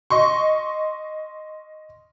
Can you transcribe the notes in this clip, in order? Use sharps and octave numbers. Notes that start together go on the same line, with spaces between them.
D#5 C6 C#6